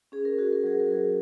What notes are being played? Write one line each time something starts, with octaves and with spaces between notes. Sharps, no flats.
C#4 G#4
A#4
F#4 G#4
A#4
F#3 G#4
A#4
F#3 G#4